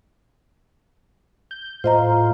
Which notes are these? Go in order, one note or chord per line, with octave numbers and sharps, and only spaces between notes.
G6
A2 F4 C5 D#5 A#5